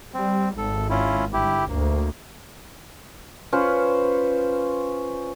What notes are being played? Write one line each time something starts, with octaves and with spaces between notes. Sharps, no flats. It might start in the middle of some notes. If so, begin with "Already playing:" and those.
G3 C4
G#1 A4
C#4 E4 F4
G1 E4 G4
D2 A#3
C#4 F4 B4 C5